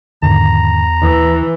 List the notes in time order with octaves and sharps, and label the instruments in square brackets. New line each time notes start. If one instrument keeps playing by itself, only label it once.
[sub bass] E2 [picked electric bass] G#2 D3 D#3 [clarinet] A#5
[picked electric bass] D#2 [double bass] E3